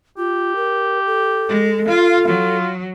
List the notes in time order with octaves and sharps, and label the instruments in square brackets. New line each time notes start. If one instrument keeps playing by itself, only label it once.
[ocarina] F4 [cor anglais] G4
[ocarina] A#4
A4
[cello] G#3
[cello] F4 [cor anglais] F5
[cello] F#3 [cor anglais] F4